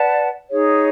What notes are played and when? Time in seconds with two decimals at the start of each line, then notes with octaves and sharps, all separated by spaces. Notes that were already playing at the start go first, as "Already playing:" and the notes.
Already playing: B4 D5 F#5 A5
0.48 D#4 G#4 C#5